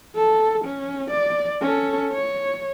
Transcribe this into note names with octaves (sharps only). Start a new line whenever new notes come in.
A4
C#4
D5
C#4 A4
C#5